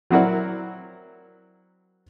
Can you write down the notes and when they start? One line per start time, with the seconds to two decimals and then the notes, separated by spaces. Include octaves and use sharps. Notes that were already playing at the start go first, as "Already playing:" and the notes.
0.11 F#3 C4 E4 F#4 A#4 D5